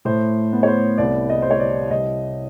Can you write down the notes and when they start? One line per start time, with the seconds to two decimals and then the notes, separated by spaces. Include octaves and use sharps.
0.05 A2 C5
0.52 B3
0.63 C#5
0.67 C5
0.98 C2 D5
1.29 D#5
1.42 G3 C5
1.51 C#5
1.60 D5
1.91 C2 D#5